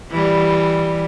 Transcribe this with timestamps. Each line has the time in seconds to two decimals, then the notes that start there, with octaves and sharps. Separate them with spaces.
0.11 E3 G3